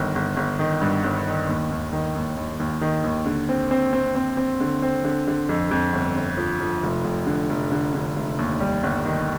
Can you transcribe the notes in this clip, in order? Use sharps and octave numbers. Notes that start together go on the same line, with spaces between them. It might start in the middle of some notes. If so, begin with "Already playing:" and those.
Already playing: G1 D#3
G1
G1
D#3
G2
G1
D#3
D#2
D#2
D#3
D#2
D#2
D#2
D#3
D#2
D3
C4
C4
C4
C4
C4
D3
C4
D3
D3
F2
F2
G1
G1
F3
F3
F1
F1
D3
F1
D3
D3
F1
D#2
G3
G1
D#3